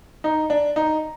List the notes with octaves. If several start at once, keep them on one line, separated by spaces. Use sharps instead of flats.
D#4
D4
D#4